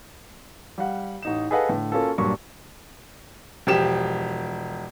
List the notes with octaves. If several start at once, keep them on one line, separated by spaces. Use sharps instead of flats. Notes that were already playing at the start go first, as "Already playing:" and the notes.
G3 F5 F#5
A1 D#4 E7
G#4 A4 B4 D#5 F5 F#5
A2 D3
A#3 C#4 F4 F#4 A4
G2 A#2 F#3 C#6
E1 F3 G4 E7